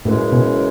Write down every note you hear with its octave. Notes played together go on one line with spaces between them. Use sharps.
F#2 A2 C#3 E3 G#3 C#4
B2